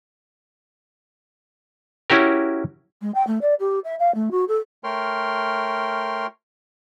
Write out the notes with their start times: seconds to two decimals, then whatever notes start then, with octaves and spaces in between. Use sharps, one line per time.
2.10 C#4 E4 F#4 G4 A#4
3.02 G#3
3.15 G5
3.27 A3
3.41 D5
3.60 G4
3.84 E5
3.99 F5
4.15 A3
4.31 F#4
4.48 A4
4.84 A3 A#4 C#5 G5 C6 F6